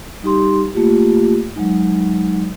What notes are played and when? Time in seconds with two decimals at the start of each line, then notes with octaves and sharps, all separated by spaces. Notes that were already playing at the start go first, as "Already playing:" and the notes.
0.22 G3 D#4 G4 C6
0.75 A3 A#3 F4 G4
1.56 F#3 G#3 D#4